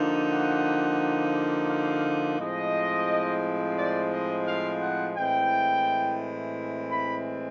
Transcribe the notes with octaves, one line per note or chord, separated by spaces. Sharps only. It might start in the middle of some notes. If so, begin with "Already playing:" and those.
Already playing: D3 F3 A#3 D#4
F#5
F5
A2 F3 G#3 C4 D#5
D5
D#5
F5
F#5
A2 E3 G#3 C4 G5
B5